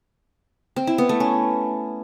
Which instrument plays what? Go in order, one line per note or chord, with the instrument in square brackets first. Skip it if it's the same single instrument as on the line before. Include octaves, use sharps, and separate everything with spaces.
[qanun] C4
E4
B3
A3
C#4